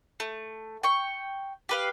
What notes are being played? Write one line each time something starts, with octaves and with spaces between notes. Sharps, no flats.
A3
G5 C#6
G4 B4 F5